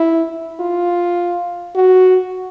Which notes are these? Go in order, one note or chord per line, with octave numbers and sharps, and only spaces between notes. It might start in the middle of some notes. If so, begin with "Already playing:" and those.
Already playing: E4
F4
F#4